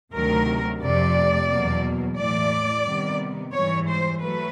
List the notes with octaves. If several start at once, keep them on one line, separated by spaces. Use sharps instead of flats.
D2 C3 D#3 F#3 A3 A#4
F2 C3 F3 A3 D5
E2 B2 F#3 A#3
A2 E3 A3 D5
C3 D#3 G3 B3
G#2 E3 G3 C#5
C5
F#3 A3 B4